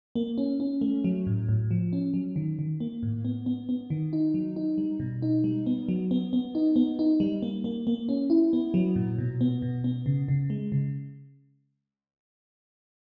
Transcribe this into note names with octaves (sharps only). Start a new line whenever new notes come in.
A#3
C#4
C#4
A3
F#3
A2
A2
F3
C#4
F#3
D#3
D#3
A#3
A2
B3
B3
B3
D#3
D#4
F#3
D#4
G3
B2
D#4
G3
B3
F#3
B3
B3
D#4
B3
D#4
G3
A#3
A#3
A#3
C#4
E4
B3
F#3
A#2
B2
B3
B2
B3
C#3
C#3
G#3
C#3